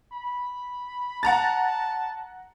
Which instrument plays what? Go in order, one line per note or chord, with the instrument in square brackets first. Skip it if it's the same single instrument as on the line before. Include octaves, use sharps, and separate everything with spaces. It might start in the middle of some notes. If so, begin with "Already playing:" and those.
[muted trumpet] B5
[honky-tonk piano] F#5 A#5 A6 [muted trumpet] A5